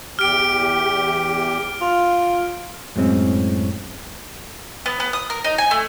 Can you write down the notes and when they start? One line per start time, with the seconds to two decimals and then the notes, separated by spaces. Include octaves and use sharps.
0.19 E2 G4 F6 D7
1.81 F4
2.96 F#2 A2 G#3 C4 C#4
4.86 B3
5.00 B3
5.13 D#6
5.30 A#4
5.44 D#4
5.58 G#5
5.71 A3